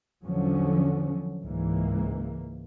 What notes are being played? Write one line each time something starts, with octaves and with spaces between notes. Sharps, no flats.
E2 D3 F3 F#3 C#4
C#2 G#2 E3 A#3